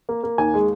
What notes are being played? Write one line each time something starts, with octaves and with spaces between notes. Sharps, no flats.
A#3
A#3
D#2 G#5
G#3